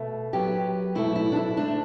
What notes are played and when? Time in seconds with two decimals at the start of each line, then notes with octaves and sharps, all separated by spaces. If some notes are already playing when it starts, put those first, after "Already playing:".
Already playing: B2 A3
0.33 F#2 F#3 B3 G4
0.95 B2 F#3 A3 E4
1.16 E4
1.32 D4
1.36 E4
1.57 D2 D3 A3 D4